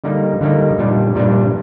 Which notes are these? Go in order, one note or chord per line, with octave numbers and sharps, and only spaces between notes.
D3 G3 A#3 D#4
D3 G3 A#3 D#4
A#2 G3 D4
A#2 G3 D4